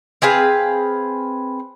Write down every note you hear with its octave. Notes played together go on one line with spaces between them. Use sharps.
C4 G#4 B4 F5